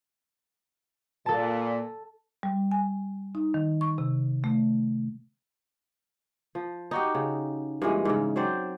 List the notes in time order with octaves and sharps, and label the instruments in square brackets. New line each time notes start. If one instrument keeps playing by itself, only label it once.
[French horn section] A#2 [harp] A4 A5
[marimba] G3
G#5
D#4
D#3
C#6
C3
A3
[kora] F3
D#4 F#4 G4
C#3
G2 A#2 E3 G#3
G#2 C#3
F#3 C4 C5 D5